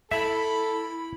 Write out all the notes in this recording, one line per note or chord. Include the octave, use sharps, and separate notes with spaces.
E4 A4 E5 B5